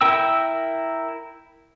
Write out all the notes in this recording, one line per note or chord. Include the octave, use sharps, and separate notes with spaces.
E4 A#4 G5 E6